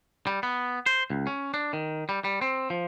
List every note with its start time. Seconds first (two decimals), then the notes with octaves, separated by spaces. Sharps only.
0.27 G3
0.43 B3
0.86 C5
1.10 C#2
1.27 C#4
1.54 D4
1.73 D#3
2.09 G3
2.24 G3
2.41 C4
2.70 F3